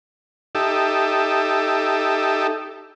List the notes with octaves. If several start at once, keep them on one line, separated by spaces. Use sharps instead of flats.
D#4 G4 A4 E5